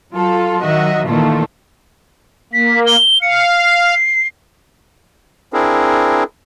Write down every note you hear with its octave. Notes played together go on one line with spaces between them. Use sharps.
F#3 F4 A4
D#3 F#3 F#4 D#5 E5
A#2 D#3 E3 A3 F4 A4
A#3 B6
G7
F5 C#7
C7
C4 D4 E4 G#4 A#4